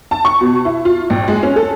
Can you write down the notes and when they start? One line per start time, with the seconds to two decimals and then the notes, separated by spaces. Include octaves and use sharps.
0.11 A5
0.25 C#6
0.41 B2
0.65 E4
0.85 F4
1.10 A#1
1.28 G#3
1.43 C#4
1.56 A4